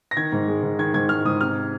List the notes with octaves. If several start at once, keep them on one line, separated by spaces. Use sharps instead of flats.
A#6
D#3 G#6
G#2
G#3
G#2
D#3 G#6
G#2 G#6
G#3 F6
G#2 D#6
C3 F6